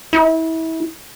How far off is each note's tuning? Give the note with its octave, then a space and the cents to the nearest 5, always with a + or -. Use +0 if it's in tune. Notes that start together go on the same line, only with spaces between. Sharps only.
E4 -30